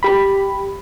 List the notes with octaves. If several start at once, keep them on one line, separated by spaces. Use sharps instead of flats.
G4 B5